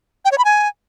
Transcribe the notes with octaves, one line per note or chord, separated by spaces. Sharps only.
G5
C#5
B5
G#5